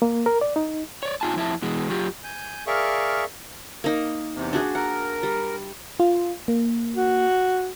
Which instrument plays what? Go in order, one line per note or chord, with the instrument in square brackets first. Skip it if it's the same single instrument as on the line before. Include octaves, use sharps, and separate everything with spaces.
[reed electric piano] A#3
A#4
D5
D#4
[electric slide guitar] C#5 D5
A#2 D#4 F4 G#5 A5
F2 E4 E5 A5
B2 E3 G#3
F#3 F4 G4
[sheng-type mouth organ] G#5 G6
G#4 A#4 D5 E5 F5 C#6
[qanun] A#3 D#4
[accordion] E2 C3
[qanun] D4 F#4 G#4
[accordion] A#4 [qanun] F#5
[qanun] G3
[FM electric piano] F4
A#3
[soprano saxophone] F#4